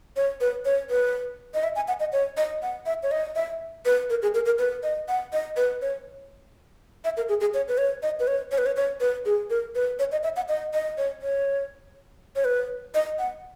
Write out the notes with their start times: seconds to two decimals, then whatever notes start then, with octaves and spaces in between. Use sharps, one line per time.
0.16 C#5
0.41 B4
0.65 C#5
0.90 B4
1.54 D#5
1.63 E5
1.76 G#5
1.88 F#5
2.00 D#5
2.13 C#5
2.37 D#5
2.62 F#5
2.86 E5
3.03 C#5
3.11 D#5
3.35 E5
3.85 B4
4.10 A#4
4.22 G#4
4.34 A#4
4.46 A#4
4.59 B4
4.83 D#5
5.08 F#5
5.33 D#5
5.57 B4
5.82 C#5
7.04 E5
7.17 A#4
7.29 G#4
7.41 G#4
7.54 C#5
7.68 B4
7.78 C#5
8.03 D#5
8.20 B4
8.27 C#5
8.52 C#5
8.58 B4
8.66 C#5
8.76 C#5
9.01 B4
9.26 G#4
9.50 A#4
9.75 B4
9.99 C#5
10.12 D#5
10.23 E5
10.36 F#5
10.49 D#5
10.73 D#5
10.98 C#5
11.22 C#5
12.36 C#5
12.45 B4
12.94 D#5
13.19 F#5